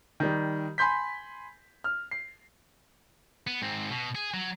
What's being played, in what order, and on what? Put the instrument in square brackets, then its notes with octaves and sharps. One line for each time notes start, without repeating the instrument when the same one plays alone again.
[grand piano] D#3 G3
G#5 B5 C6 G6 B6
F6
C7
[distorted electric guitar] B3
G#2 C4
B2
G#4
F#3